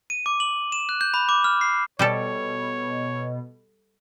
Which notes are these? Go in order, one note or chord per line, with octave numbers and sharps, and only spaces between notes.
D#7
D6
F#7
E7
F#6
G6
B5
D6
F6
C7
B2 G3 G4 A4 C#5